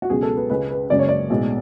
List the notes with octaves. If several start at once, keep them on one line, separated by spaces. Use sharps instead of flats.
F#4
C#2 B2 F#3 G#4
A4
B4
C#2 C#3 G#3 B4
B4
F#1 F#2 C#3 G#3 D5
C#5
D5
B1 A2 G#3